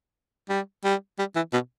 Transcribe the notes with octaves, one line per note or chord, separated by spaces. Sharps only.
G3
G3
G3
E3
B2